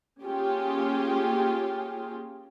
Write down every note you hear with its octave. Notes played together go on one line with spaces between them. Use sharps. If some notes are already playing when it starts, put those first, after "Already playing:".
A#3 C#4 F4 G4 G#4